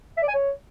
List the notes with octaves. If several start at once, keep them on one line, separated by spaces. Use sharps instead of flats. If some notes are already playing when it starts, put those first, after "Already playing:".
E5
D5
G#5
C#5